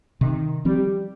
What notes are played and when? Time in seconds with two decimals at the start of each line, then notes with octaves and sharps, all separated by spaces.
0.21 C3 D#3
0.65 F3 G3 C4